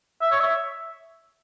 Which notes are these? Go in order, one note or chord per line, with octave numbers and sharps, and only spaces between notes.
E5
C#5
E5